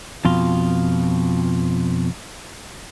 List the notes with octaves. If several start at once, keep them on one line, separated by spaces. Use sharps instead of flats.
F2 B2 F4